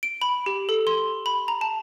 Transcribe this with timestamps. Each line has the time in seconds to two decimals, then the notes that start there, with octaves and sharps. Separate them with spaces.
0.03 D7
0.22 B5
0.46 G4
0.69 A4
0.87 C6
1.26 B5
1.48 A#5
1.61 A5